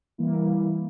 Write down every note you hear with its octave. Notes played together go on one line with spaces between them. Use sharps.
E3 G3 A#3 E4